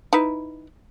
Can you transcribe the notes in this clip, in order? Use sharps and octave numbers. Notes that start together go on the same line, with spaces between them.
D#4 E4 B4